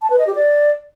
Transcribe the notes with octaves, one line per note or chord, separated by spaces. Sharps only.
A5
B4
D#5
G4
D5